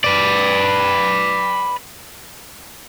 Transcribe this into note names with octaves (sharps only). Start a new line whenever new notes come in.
B4 D5